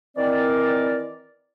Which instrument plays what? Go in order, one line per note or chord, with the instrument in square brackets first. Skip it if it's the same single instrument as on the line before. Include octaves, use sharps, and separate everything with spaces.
[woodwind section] D#3 E3 C4 A#4 D5